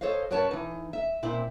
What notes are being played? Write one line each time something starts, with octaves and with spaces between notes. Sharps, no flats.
A4 C5 C#5 D#5 F5
F#2 A#4 B4 C#5 A5
E3 D#4
E5
A#2 C4 E4